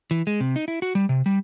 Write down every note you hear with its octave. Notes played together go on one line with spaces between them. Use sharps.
E3
G#3
C3
D#4
E4
F#4
G3
C3
G3